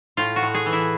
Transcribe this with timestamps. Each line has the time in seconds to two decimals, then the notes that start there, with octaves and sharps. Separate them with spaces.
0.17 A2 F4
0.36 F#4
0.42 A2
0.54 G#4
0.66 E3
0.73 E4